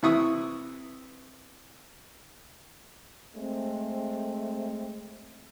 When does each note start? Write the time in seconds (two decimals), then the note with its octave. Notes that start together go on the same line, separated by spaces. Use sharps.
0.03 C3 E3 E4 C#6 D#6
3.35 G#3 A3 C4